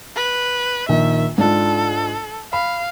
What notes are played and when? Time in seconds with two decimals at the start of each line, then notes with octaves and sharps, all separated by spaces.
0.16 B4
0.89 A#1 D#3 E5
1.38 G#2 D4 F4 A4
2.53 F5 B5